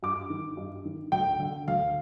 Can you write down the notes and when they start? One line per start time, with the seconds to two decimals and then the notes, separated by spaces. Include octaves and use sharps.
0.03 G2 D6
0.30 D#3
0.57 G2
0.85 D#3
1.12 D2 G5
1.39 D3
1.68 D2 F5